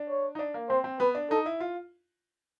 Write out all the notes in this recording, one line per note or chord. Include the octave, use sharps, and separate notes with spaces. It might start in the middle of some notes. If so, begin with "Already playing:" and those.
Already playing: D4
C#5
D#4
D4
A#3
C4 C5
C4
B3 B4
D4
D#4 A4
E4
F4